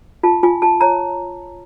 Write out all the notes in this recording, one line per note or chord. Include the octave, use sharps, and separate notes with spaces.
F4 A5
F4 G#5
F4 A5
C#5 A#5